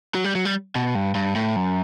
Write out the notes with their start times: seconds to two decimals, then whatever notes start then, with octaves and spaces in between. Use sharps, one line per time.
0.15 F#3
0.24 G3
0.35 F#3
0.45 G3
0.75 B2
0.95 G2
1.15 G2
1.35 A2
1.56 F#2